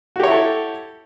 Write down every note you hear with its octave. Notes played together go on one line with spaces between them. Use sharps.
E4 F#4 G4 A4 C#5